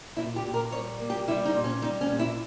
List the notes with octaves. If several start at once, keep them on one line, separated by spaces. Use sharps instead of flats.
A#2 E4
G4
A#2
A#4
G3 C#5
A#3
G4
G3 E4
D#4
A#2
C#4
G3 D#4
C#4
A#2
E4